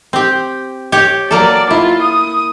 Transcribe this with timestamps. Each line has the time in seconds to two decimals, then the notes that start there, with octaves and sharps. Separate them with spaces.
0.13 C4 G4
0.92 G4 C#5
1.31 F#3 A#3 A4 D5
1.71 E4 F4
2.02 D#6